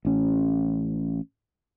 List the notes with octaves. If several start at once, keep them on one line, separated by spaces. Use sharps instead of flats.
A1 C#4